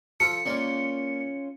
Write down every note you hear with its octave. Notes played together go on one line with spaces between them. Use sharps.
F3 F4 A4 C#7
A#3 C#4 F4 D5